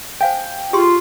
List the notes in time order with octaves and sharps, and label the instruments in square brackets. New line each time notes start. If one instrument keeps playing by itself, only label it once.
[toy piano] C5 F5 G#5 [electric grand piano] G5
[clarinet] F4 [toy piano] G4 G#4 C6